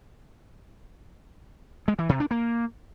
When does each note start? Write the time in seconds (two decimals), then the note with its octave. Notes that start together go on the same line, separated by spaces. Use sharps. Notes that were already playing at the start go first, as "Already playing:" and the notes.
1.88 G#3
1.99 E3
2.09 C3
2.20 D4
2.31 A#3